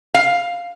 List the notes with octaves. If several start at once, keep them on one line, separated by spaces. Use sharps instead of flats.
F5